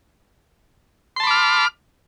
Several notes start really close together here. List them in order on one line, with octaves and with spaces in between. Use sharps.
C6 A5 B5 D6 F6